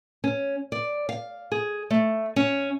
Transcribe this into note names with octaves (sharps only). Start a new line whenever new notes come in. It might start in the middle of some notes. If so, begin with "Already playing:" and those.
C#4
D5
F5
G#4
A3
C#4